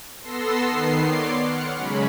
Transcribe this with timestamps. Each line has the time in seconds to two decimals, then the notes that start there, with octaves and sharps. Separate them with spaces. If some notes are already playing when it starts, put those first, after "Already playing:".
0.20 B3 A4 C6 E6 A#6 C7
0.66 D#3 B3 C7
1.05 C#5 D5 C6 D6
1.43 F#5 F6 C#7
1.77 C#3 F#3 G#3 C#4 B5